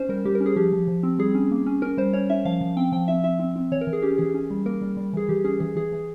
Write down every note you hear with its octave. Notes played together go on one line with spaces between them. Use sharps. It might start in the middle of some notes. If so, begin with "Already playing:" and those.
Already playing: C#4 C5
G3 A#4
G3 G4
A#4
C#4
G#4
F3 G4
F3
F3
C4
G3 G#4
C#4
A#3
C#4
C#4 A#4
G3 C5
C#4 C#5
C#4 E5
F3 F5
F3
C4 G5
F3 G5
C4 E5
C4 E5
C4
C4
E3 C#5
A#4
E3
G#4
C#4 G4
E3 G#4
C#4
G3
A#3 A#4
G3
G3
E3 G#4
E3 G4
C#4 G#4
E3 G#4
E3 G#4
E3